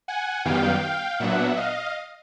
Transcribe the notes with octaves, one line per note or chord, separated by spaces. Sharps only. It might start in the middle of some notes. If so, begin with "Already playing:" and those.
F#5 G#5
F#2 D#3 G3 B3 F5 G5
A#2 F#3 B3 D4 E5 F#5
D#5 F5